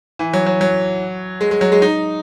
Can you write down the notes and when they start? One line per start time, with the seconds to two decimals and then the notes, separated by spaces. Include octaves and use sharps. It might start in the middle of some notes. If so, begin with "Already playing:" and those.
0.19 E3
0.34 F#3
0.46 F#3
0.61 F#3
1.41 G#3
1.51 G#3
1.61 F#3
1.72 G#3
1.82 D#4